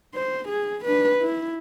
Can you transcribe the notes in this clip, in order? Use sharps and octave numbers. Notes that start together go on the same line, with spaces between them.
C5
G#4
D4 B4
E4